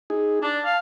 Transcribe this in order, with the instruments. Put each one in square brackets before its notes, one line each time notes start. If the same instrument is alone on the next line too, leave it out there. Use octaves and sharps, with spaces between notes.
[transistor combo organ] D#4 G#4
[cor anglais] D4 [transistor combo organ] A5
[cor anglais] F5